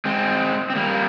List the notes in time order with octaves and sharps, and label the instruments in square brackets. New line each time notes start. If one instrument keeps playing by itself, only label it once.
[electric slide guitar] G#3 C4
C4
G3 A#3